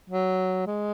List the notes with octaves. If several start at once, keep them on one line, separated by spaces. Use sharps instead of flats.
F#3
G#3